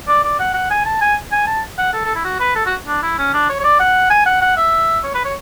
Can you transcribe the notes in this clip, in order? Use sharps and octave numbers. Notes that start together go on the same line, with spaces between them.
D5
D5
F#5
F#5
G#5
A5
G#5
G#5
A5
F#5
A4
A4
E4
F#4
B4
A4
F#4
D4
E4
C#4
D4
C#5
C#5
D5
F#5
G#5
F#5
F#5
E5
C#5
B4
C#5